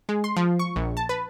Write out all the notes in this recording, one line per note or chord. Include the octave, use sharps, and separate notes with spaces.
G#3
C6
F3
C#6
A#1
A5
B4